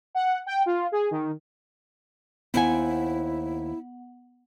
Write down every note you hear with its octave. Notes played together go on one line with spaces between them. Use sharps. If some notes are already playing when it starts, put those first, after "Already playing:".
F#5
G5
F4
G#4
D#3
D#2 B3 E4 C5 F#5 G#5